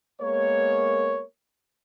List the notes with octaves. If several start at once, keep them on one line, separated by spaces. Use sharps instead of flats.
G#3 A#3 B3 A#4 C#5